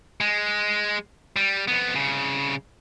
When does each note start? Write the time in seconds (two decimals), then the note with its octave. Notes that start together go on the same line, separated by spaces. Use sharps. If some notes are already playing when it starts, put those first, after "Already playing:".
0.21 G#3
1.36 G3
1.68 F2 B3
1.95 C2 C#3